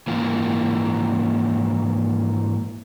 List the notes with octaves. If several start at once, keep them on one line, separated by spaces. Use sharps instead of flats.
G#2 E3 A#3 F4